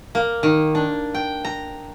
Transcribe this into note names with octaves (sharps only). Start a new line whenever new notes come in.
A#3
D#3
D4
G5
A#5